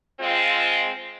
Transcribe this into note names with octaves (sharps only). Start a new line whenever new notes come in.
G#3 C4 F4